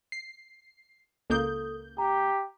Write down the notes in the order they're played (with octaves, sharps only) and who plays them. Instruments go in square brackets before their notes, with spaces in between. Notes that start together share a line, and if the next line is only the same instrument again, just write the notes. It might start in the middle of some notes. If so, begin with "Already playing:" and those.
[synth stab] C7
[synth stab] C#2 A#3 G6 [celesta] A4 D#6
[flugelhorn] G4 [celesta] A#5